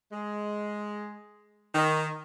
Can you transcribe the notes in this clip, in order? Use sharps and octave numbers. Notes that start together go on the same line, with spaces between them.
G#3
D#3